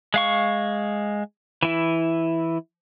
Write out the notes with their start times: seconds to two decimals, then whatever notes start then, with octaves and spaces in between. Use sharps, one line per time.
0.14 G#3 F5 C#6
1.63 E3 E4